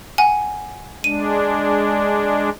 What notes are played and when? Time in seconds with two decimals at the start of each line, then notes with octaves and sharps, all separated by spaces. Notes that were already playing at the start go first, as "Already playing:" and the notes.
0.18 F#5 G#5
1.04 G#3 D4 D#7